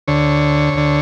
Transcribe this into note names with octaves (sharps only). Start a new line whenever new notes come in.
D2 D3 C#5
D2 D3